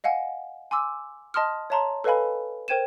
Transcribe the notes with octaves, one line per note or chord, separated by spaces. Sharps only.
D#5 F5 F#5 G#5
G#5 C6 D6 E6
D#5 A5 C6 D#6 F6
C#5 E5 A5 A#5 C6
A4 B4 D#5 F5 G#5 B5
A#4 C5 G5 G#6 D#7 E7